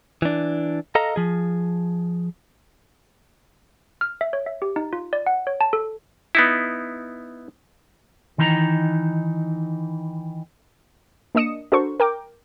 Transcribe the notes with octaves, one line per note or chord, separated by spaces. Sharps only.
E3 D4
A4 D#5 F5 A#5
F3 G#4
F6
E5
C#5
E5
G4
D#4
F4
D5
F#5
C#5
A5
A4
B3 D#4 E4
D#3 E3 D#4 E4 A#5
A#3 D4 D#5 D#6 C#7 E7
D4 F#4 A4 A#4 C5 C#6
A#4 G5 D6